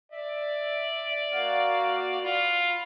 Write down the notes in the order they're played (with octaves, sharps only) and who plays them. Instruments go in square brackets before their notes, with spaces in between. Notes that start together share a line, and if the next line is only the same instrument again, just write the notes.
[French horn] D5 [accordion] E5
[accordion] A#3 F#4 F5
[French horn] F4 [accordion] B5